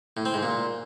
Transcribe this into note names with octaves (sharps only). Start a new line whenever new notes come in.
A2
C4
G#2
A#2